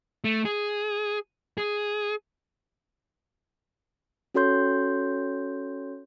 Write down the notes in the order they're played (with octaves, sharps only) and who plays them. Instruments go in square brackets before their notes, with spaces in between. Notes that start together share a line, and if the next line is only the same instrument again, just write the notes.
[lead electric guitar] A3
G#4
G#4
[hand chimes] C#4 F#4 A4 C#5 C6 G6